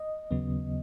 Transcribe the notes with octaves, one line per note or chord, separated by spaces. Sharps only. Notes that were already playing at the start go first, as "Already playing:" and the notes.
Already playing: D#5
D#2 C#3 F#3 B3